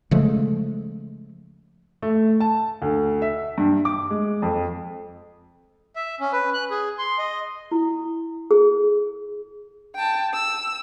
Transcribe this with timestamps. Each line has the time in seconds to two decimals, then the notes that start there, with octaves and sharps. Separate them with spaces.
0.11 C#3 F3 G#3 A3
2.02 A3
2.40 A5
2.82 D2
3.22 E5
3.58 G2
3.85 D6
4.10 G#3
4.42 F2
5.96 E5
6.20 C#4
6.33 B4
6.54 F#6
6.70 G#4
6.98 C6
7.18 D#5
7.71 E4
8.51 G#4
9.95 G5 A5
10.34 E6